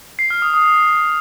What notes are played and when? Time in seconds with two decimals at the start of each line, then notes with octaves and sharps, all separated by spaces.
0.19 C7
0.30 F6
0.42 D#6
0.54 D#6